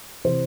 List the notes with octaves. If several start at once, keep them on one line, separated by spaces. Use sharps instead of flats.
C3 E3 C5